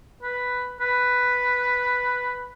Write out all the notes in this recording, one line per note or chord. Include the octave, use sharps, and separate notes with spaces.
B4
B4